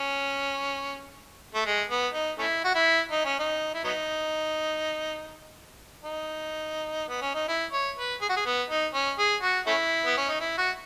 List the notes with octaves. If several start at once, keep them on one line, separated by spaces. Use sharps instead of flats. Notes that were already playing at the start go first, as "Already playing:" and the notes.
Already playing: C#4
A3
G#3
B3
D#4
A3 C#4 E4
F#4
E4
D#4
C#4
D#4
E4
F#3 B3 D#4
D#4
B3
C#4
D#4
E4
C#5
B4
G#4
F#4
G#4
B3
D#4
C#4
G#4
F#4
A3 C#4 E4
B3
C#4
D#4
E4
F#4